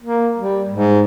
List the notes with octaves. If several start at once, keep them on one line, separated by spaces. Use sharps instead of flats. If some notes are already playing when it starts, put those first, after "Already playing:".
A#3
G3
G#2